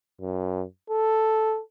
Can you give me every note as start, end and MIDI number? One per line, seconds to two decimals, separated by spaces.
0.21 0.64 42
0.90 1.60 69